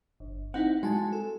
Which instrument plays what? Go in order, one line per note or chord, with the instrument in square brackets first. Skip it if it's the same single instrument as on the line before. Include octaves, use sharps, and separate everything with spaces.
[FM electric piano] G1
[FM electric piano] C4 D#4 E4 [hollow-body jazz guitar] F#5
[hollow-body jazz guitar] G#3 [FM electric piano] F#4 G#5 A5
[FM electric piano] A4